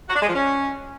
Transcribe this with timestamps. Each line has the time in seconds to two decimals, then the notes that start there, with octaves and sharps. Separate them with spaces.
0.09 F#4
0.15 D4
0.22 G#3
0.28 F3
0.34 C#4